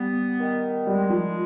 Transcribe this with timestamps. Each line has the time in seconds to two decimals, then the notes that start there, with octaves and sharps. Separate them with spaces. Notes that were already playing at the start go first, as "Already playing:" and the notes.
Already playing: G3 B3
0.40 D#3
0.87 G3 G#3
1.10 F3